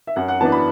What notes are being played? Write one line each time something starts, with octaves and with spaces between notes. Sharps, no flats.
E5
F#2 F#5
F#5
E3 B3 D4 A5
B5